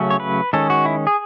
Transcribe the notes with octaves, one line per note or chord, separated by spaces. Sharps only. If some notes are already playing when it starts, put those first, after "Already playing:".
Already playing: C#3 F#3 A3 C#4
C#5
B4
D#3 G#3 C#4 A4
F#4
E4
G#4